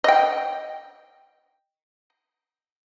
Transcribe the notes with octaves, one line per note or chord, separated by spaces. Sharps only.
D#5 G5